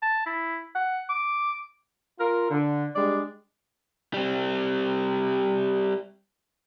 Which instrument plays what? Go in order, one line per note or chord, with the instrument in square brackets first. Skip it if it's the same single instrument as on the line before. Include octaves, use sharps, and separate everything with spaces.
[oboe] A5
E4
F#5
D6
[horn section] F4 A#4
D3
G3 G#3 D4 D5
[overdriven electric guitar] G3 C4